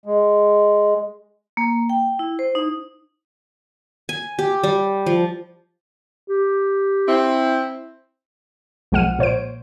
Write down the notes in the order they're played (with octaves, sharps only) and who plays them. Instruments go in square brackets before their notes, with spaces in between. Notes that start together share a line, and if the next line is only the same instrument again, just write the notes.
[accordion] G#3
[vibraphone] A#3
G5
E4
C5
D#4
[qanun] G#5
G4
G3
F3
[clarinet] G4
[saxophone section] C4 E4
[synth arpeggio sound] B1 F3 G#3 F#5 F6 D#7
A#2 C5 C#5 D7